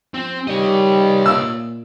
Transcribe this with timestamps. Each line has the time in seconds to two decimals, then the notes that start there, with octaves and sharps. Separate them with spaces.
0.14 F3 C4
0.48 D#3 G3 C#5 D#5
1.26 A#2 E6